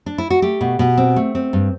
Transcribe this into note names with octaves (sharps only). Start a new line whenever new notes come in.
D4
E4
F#4
A3 G4
B2
B2
C4
A3
C4
G2